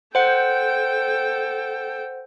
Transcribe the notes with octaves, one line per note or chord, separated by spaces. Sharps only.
A4 C5 F#5 G5